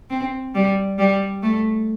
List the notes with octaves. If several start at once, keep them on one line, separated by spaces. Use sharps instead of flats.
C4
G3
G3
A3